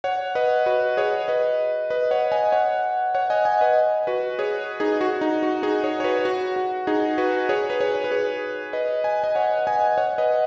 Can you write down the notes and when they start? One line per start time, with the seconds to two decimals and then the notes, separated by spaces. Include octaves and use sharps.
0.04 C#5 F#5
0.35 B4 D#5
0.66 F#4 B4
0.97 G#4 C#5
1.28 B4 D#5
1.90 B4 D#5
2.11 C#5 F#5
2.32 D#5 G#5
2.52 C#5 F#5
3.15 C#5 F#5
3.30 D#5 G#5
3.45 D#5 G#5
3.61 B4 D#5
4.07 F#4 B4
4.39 G#4 C#5
4.80 D#4 G#4
5.01 F#4
5.21 D#4
5.43 F#4
5.63 D#4 G#4
5.84 G#4 C#5
6.00 C#5
6.04 F#4 B4
6.25 F#4
6.56 F#4
6.87 D#4 G#4
7.18 F#4 B4
7.49 G#4 C#5
7.70 B4
7.80 G#4 C#5
8.04 B4
8.11 G#4 C#5
8.73 B4 D#5
9.04 G#5
9.24 D#5 G#5
9.35 C#5 F#5
9.67 D#5 G#5
9.98 C#5 F#5
10.18 B4 D#5